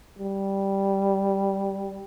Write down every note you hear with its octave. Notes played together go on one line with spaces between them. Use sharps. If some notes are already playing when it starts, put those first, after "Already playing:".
G3